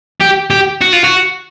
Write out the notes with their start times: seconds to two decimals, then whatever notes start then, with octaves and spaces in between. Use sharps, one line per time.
0.20 G4
0.50 G4
0.82 F#4
0.93 F4
1.04 F#4